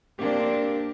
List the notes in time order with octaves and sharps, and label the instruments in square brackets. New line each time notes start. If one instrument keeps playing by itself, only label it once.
[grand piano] A#3 G4 [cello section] C4 D4